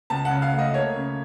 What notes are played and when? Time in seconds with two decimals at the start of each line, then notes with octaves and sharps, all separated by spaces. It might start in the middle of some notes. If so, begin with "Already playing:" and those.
0.10 C#2 A5
0.25 F#5
0.31 C#3
0.42 F5
0.53 A3
0.59 D#5
0.74 A#3 C#5
0.96 C#3